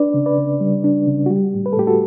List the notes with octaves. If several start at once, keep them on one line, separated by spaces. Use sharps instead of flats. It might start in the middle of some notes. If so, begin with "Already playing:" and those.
Already playing: D4 B4 D5
C#3
B4 D5
C#3
G3
D4
C#3
F#4
G3 G4
A2
B4
A4
A2 G4
F#4 A4